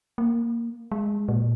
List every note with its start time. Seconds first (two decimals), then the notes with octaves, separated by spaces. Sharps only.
0.18 A#3
0.92 G#3
1.28 A#2